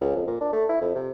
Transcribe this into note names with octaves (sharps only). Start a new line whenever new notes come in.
C#2
F2
A#2
D4
A3
E4
F2
C3